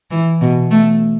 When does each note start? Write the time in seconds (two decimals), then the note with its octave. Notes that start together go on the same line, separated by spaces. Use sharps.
0.11 E3
0.41 B2
0.71 A3